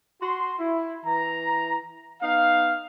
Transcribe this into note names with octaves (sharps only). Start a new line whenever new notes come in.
F#4 C6
E4
E3 A#5
B3 D#4 F5